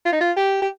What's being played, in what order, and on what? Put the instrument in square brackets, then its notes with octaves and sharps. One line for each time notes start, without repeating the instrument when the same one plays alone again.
[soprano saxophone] F4
D#4
F4
G4
G4